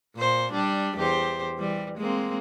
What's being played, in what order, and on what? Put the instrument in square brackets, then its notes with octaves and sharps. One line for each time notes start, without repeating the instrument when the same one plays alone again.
[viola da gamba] A#2 C5
G3 D4
E2 G4 C5
E3 G3
G#3 A#3 C4